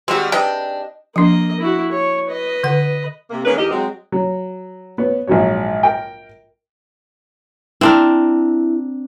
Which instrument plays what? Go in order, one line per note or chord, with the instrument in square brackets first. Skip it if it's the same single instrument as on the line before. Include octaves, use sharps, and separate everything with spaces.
[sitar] D#3 G3 G#3 [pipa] C4 F#4
[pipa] C3 B4 G5 [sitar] D4 D#5
[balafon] F3 D4 [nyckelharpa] A#3 D#5
[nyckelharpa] E4 F#4
C#5
B4 D#5
[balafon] D3 F#5
[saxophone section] C3 A#3
D#3 A#3 C#4 G#4 B4
E2 D#4 G4 A#4 D#5
F#3 G#3 C4
[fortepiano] F#3
B3 C#5
A#1 G#2 F#3 F#4 C#5
A#4 G5
[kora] C4 D4 A#4 [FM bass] E4